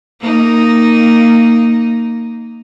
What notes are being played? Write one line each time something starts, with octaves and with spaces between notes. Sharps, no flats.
A#3 D#4